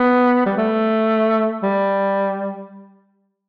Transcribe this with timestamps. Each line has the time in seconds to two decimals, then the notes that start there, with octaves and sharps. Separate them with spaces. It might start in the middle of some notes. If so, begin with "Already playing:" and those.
Already playing: B3
0.46 G3
0.57 A3
1.63 G3